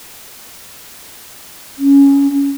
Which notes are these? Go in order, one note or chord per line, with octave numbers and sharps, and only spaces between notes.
C#4